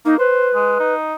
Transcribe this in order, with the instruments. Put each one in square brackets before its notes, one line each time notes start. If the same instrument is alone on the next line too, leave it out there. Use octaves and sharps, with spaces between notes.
[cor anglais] A#3 [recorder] D#4
[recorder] B4 [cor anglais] C5
[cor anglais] G#3
D#4